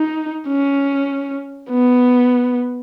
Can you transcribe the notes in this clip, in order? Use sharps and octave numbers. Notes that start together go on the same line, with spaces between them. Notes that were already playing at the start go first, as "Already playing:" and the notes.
Already playing: D#4
C#4
B3